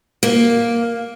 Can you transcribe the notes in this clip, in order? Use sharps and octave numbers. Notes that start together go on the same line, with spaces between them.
A#3